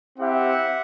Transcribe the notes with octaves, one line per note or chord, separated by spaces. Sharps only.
C4 E4 G4 E5 F#5